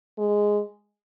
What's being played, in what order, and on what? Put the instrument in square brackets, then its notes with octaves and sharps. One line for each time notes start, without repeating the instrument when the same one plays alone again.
[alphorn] G#3